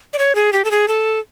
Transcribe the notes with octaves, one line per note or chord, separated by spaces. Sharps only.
D5
C#5
G#4
G4
A4
G#4
A4